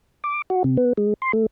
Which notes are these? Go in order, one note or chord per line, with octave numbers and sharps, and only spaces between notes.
D6
F#4
C3
B3
G#3
C6
A3